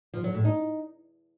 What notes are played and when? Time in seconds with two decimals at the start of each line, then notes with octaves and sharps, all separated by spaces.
0.14 F3
0.24 F#3
0.34 A2
0.45 D#4